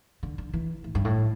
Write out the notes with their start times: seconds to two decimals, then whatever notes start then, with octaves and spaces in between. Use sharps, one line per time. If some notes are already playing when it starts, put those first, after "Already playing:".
0.23 D3
0.38 D3
0.53 E3
0.84 A2
0.95 G2
1.05 A2